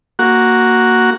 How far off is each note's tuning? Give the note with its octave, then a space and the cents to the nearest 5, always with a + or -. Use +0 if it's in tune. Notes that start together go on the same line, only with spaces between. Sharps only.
A#3 +0 F#4 +0